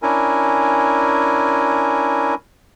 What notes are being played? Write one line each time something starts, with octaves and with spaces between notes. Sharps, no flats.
C#4 D4 E4 A#4 G#5